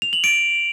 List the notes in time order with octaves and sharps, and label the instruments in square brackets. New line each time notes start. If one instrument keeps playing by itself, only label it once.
[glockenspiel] F7
F#7
D7